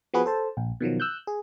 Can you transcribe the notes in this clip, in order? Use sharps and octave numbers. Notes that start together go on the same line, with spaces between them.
F3 B3 F#4 G#4 B4
A4 C5 A5
A#1
B2 D#3 F3 F#3
E6 F#6 G6
G#4